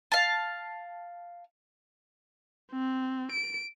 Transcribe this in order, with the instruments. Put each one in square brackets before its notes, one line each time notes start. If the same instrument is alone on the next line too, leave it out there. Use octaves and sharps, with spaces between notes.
[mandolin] F5 A5
[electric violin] C4
D7